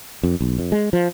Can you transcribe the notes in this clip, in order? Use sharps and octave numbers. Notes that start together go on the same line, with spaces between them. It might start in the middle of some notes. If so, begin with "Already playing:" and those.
F2
B1
F2
G#3
F3